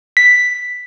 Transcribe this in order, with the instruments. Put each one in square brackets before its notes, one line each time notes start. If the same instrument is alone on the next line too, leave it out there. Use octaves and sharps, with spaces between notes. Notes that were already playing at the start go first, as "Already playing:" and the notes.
[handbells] B6